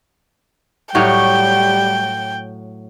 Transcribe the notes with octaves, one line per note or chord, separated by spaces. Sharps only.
A2 F#3 G3 C#5 G5